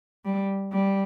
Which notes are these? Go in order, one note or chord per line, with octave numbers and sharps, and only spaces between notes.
G3
G3